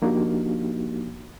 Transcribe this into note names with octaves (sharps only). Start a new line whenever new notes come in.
F3 A#3 D4 D#4 F#4 G4